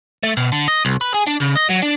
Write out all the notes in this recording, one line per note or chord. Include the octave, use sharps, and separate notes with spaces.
A3
B2
D3
D#5
C2
B4
G#4
D4
C#3
D#5
F#3
D4